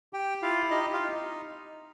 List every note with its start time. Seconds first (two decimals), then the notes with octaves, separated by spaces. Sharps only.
0.13 G4 G5
0.42 E4 F4 F5
0.71 D#4 G4 D#5
0.93 F4 F5
1.00 D#4